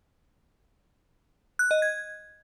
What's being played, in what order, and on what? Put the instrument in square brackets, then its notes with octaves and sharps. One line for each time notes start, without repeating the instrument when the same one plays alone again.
[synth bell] F#6
D#5
G#6